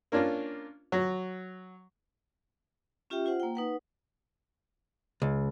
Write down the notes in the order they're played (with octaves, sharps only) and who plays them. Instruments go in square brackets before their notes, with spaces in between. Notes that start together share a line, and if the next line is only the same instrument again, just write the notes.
[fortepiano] A#3 C#4 D4 F4
F#3
[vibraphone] C#4 F4 G4 E5 G5
F4 C5 F#5
A#3 G5
D#4 B4 F#5
[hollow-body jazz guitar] C#2